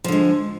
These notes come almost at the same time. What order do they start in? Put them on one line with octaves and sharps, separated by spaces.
F3 D3 G#3